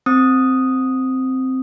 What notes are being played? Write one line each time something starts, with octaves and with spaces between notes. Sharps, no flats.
C4 D#6